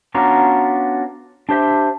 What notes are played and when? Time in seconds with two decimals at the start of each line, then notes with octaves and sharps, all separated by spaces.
0.14 B3 C#4 D4 F4 F#4 A#5
1.49 D4 G4 C5 E5